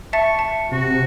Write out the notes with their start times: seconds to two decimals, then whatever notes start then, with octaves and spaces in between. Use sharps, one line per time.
0.13 E5 A5 C#6 A6
0.39 A5
0.71 C3 F#4